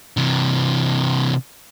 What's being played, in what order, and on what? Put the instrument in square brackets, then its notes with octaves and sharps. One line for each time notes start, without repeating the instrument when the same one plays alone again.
[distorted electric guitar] C3 E3